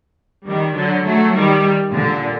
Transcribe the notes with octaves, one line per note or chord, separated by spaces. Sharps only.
D#3 G3
D3 F#3
F#3 A3
D#3 G3
A#2 D3